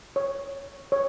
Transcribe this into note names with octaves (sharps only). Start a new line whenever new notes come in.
C#5
C#5